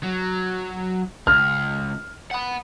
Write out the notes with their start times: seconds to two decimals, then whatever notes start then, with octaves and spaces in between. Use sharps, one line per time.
0.03 F#3
1.27 C#2 F6
2.31 F#5 B5